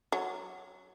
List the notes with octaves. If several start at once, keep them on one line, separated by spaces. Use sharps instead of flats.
F#3